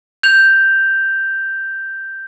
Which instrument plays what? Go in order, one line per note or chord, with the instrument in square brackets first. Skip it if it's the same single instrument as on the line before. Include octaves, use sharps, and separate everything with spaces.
[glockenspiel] G6 F7